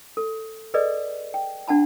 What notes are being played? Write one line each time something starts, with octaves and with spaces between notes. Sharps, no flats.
A4
G#4 A4 B4 D5 D#5
G5
D4 F#5 A5 B5